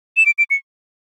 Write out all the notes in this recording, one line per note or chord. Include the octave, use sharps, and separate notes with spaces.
E7
D7
D7
C#7